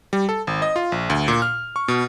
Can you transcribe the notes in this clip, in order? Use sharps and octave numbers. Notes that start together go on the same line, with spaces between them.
G3
A4
G#1
D#5
F4
A#1
D2
A#2
F6
C#6
B2